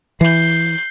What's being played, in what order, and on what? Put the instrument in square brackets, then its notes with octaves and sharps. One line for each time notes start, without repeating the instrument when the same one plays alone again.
[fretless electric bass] E3 [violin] G6 C7